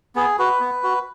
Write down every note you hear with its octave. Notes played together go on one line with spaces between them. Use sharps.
B3 G#4
F#4 B4
B3
F#4